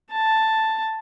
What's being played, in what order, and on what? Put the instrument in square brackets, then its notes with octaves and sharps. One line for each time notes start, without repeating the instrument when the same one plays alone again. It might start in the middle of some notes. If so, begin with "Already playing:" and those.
[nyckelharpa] A5